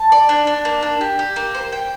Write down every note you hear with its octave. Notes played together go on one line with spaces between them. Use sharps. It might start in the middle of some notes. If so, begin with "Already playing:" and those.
Already playing: A5
D5
D4
D4
A#3
D4
G4
G4
A#3
C5
G5